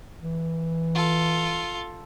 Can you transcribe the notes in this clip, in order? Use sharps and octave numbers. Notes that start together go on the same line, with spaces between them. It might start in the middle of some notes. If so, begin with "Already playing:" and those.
E3
F4 A4